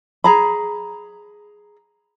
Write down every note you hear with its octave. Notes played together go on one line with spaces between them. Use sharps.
G#4 A#5 B5